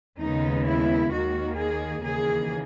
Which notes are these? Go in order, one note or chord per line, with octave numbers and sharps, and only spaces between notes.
D#2 C#3 G#3 B3 D#4
E4
D#2 D#3 A#3 F#4
G#4
D#2 C#3 E3 A#3 G#4